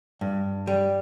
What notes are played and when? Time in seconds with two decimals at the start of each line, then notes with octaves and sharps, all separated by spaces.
0.21 G2
0.67 G3